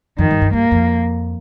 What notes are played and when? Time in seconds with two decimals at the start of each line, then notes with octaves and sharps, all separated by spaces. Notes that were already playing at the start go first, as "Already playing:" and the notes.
0.18 F2 D#3
0.31 G2
0.41 G2
0.53 G2 A#3
0.71 F2